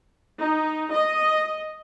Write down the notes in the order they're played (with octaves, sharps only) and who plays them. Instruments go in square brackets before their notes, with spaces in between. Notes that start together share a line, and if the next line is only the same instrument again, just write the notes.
[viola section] D#4
D#5